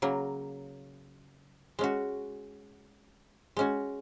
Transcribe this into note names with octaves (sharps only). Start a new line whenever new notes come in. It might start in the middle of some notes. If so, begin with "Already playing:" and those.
C#3 F#3 A#3
G#3 C#4 F#4
G#3 C#4 F#4